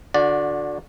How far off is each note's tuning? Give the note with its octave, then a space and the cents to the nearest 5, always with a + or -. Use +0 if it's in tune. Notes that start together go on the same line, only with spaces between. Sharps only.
D3 +0 F#4 -35 D5 +0